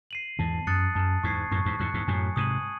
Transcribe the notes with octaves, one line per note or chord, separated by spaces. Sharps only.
C7 D#7 F#7
E2 G#2 A5
F#2 D#6 F#6 A6 C#7
F#2 A5
E2 G#2 C#6 G#6 C7
F#2 A2 C#6
E2 G#2
E2 G#2 F#6 C#7
E2 G#2
F#2 A2 G#5
G#2 C3 D#6 G#6 D#7 F#7